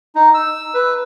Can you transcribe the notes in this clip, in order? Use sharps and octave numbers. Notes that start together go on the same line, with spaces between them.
D#4
E6
B4